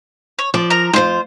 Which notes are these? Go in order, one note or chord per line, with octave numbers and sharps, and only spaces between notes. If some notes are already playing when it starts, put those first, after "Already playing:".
C#5
F3 D5
A#4 A#5
F2 G#2 F4 C5